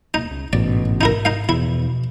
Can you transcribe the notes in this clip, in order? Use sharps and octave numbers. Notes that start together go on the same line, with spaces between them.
D1 A#3 D#4
C#2 C#4
A1 G#2 B2 D5
D#4 E4 A#4
D#4 F5
E2 B2 F3 B3 E4